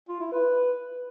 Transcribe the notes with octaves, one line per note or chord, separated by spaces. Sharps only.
F4
E4
B4